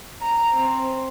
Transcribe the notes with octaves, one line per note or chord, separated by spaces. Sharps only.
A#5
C4